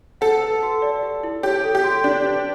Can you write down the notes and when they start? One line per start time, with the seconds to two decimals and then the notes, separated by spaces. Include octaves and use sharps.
0.21 A4 F#5
0.42 B4
0.63 F#4
0.82 D5
1.03 G4
1.23 E4
1.43 G4 C#5
1.63 A4
1.75 G4
1.84 F#4
2.04 D4 D5
2.25 B4